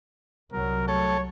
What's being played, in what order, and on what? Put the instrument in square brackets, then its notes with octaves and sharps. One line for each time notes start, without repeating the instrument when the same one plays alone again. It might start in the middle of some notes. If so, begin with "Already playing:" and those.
[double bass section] C2 F#3 [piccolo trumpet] A#4
[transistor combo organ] A3 A4 [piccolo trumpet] C#5